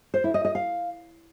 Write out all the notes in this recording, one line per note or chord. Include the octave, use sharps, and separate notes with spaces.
C5
E4
D#5
D#5
F5